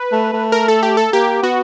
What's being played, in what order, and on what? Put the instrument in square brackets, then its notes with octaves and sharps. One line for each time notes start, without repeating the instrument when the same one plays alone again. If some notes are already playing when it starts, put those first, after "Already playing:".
Already playing: [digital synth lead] B4
[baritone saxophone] A3
A3
[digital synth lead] A#4
A4
G4
A4
[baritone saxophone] A#3 [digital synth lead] G4
[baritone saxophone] B3 [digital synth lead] F#4